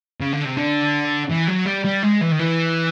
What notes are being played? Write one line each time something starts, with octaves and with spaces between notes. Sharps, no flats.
C#3
D3
C3
D3
E3
F#3
G3
G3
G#3
E3
D#3
E3